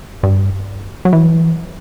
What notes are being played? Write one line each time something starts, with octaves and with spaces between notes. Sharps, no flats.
G2
F#3
E3